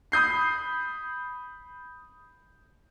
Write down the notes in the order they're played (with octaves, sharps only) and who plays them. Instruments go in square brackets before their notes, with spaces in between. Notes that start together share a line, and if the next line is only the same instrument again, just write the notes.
[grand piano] B5 D#6 G6 C7